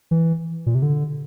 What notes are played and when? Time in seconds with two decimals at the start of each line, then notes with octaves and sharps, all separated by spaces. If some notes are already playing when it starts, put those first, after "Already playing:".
0.11 E3
0.66 A#2
0.75 C3
0.82 D3